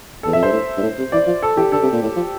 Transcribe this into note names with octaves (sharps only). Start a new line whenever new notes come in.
A4
E2
F2 E5
G2 C5
A2
G2
A2
C3
E3 D5
F3
A4
E3 G4
D3 A4
C3
A#2
A2
F3